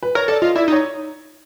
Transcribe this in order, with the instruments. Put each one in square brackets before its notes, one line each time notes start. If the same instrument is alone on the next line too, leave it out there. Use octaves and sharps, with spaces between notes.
[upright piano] B4
[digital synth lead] A#4 [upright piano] C#5
[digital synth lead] A4 [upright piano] D5
[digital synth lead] F4 [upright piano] D#5
[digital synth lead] E4 [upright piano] D5
[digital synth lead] D#4
[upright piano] C#5